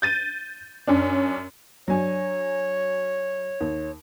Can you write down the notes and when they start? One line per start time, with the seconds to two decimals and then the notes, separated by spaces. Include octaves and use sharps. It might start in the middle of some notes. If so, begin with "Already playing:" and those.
0.02 G6 A6 D#7
0.87 F#2 C#4 D4
1.88 F#3 D4 C#5 G#5
3.61 D#2